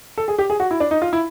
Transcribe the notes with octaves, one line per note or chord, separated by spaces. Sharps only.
A4
G#4
G4
G#4
F#4
E4
D4
D#4
F4
E4